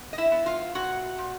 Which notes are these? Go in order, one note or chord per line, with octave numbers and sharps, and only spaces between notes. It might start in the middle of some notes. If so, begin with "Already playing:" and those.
Already playing: B3
D#5
E4 E5
B3
F4 F5
A#2 F#4 F#5
A#2